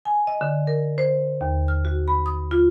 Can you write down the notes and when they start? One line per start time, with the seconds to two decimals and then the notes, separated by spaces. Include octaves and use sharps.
0.05 G#5
0.27 D#5
0.41 D3
0.67 A#4
0.98 C5
1.41 D#2
1.68 F6
1.85 F#4
2.08 B5
2.26 D#6
2.51 F4